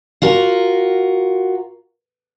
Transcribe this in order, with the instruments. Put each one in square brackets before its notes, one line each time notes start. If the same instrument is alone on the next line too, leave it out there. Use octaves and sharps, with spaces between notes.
[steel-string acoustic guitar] F4 F#4 A#4